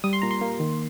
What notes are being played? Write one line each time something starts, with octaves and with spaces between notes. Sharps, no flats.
G3 D#6
C6
A#2 A#5
C6
A#3
D#3